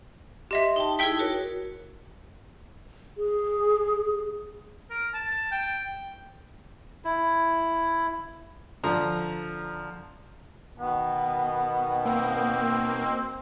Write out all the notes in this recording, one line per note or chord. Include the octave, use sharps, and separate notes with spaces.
G4 D#5 E5 C6
D#4 G5 A5
D#4 E4 G#4 G5 B6
F#4 A#4 C#5
G#4
A#4
A5
G5
E4
D3 F3 A#5
B2 D#3 B3
A#3 C4